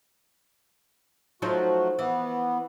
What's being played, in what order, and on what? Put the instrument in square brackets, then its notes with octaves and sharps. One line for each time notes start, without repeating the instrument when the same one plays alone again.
[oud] F3 F#3 D#4 [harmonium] A3 F#4
[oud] E3 [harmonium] B3